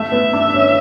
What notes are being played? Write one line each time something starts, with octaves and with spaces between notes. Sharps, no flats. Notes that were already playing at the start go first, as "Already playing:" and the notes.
Already playing: A3 E5
B3
D4
C#4